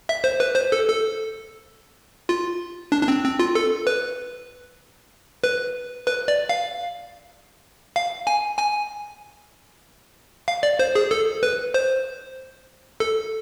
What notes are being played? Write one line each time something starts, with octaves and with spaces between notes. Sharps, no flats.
E5
C5
B4
C5
A4
A4
F4
D4
D4
C4
C4
F4
A4
B4
B4
B4
D5
F5
F5
G#5
G#5
F5
D5
C5
G#4
A4
B4
C5
A4